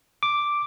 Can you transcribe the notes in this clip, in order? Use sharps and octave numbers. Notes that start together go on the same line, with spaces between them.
D6